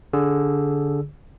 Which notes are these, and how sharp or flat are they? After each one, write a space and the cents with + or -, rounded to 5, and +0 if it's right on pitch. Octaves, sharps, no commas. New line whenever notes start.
D3 -15 G#4 -5 E6 +0